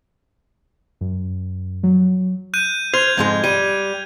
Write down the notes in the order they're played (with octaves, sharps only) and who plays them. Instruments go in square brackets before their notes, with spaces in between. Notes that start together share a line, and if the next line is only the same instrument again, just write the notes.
[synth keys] F#2
F#3
[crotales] F#6 G6 D#7
[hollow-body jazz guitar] C5 [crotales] F6 G#6 F7
[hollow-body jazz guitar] F2 G#2 G#3
[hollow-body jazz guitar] G3 [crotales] D#7